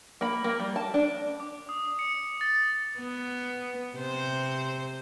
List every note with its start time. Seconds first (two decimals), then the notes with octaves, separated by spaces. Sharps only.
0.21 A#3 B5
0.44 A#3
0.60 G3
0.76 A5
0.94 D4
1.40 D6
1.69 D#6
1.99 C#7
2.41 A6
2.97 B3
3.96 C3 C5